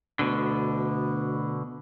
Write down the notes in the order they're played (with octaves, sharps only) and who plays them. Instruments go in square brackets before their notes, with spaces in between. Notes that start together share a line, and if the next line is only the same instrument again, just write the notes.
[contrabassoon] D2 [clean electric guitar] B2 D3